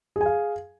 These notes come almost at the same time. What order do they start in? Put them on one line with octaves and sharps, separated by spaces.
G#4 G#5 F5